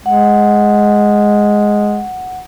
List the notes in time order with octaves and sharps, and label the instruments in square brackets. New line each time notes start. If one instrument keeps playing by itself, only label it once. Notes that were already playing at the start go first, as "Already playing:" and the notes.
[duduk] G#3 [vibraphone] F#5